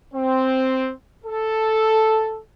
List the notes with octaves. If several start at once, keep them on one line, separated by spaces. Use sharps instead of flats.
C4
A4